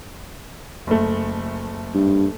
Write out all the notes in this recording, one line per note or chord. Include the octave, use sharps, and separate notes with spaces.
F#1 A3
G2